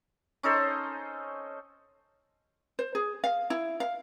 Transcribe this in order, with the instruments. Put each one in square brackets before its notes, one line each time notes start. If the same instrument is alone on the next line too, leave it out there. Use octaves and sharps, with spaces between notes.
[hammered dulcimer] C#4 D#4 A4 C5
[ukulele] C5
G#4
F5
E4
F5